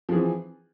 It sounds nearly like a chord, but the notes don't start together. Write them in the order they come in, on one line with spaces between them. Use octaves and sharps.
F3 G#4 E3 C4